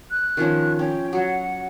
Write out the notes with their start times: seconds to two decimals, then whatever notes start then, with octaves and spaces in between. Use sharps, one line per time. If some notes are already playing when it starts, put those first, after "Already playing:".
0.10 F#6
0.37 D#3 F3 C#4
0.79 C#4 G5
1.13 F#3 F#5